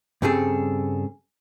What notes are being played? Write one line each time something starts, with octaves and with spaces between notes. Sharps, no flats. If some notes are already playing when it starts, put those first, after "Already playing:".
G2 C#3 G3 C4 G#4 A4